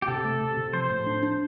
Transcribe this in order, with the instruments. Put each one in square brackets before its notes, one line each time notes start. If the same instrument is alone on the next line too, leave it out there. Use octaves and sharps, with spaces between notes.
[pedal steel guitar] G4
[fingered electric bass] C3 [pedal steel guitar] A4
[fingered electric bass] A3
C3
C3
[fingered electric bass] F3 [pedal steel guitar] C5
[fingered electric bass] A2
D4
D4